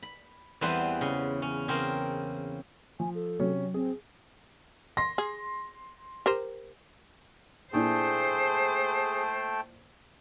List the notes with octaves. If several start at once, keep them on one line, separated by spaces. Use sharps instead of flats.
B5
E2 E3 G3 B3 C4 C6
C#3
C#4
C#3 C4 A#4
F3 G#5
A4
C3 F#3 C#4
C4 G#4
C6 A#6
G#4
G4 A#4 C5
A#2 A3 D4 E4 G#4 C5 G5 A5